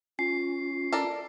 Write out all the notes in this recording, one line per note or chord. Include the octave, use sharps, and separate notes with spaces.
C#4 F4 C7
A4 A#4 D5